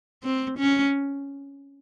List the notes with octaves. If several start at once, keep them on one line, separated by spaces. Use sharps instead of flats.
C4
C#4